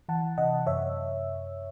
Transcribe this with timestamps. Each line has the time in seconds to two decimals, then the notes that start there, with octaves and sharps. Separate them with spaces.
0.09 E3 F#5 A5
0.38 C3 D#5 F#5
0.67 F#2 C#5 E5